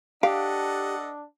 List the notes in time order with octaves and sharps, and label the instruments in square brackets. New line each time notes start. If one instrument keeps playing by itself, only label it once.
[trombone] D4 [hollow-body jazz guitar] G4 [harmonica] A4 D#5 F#5 [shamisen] F5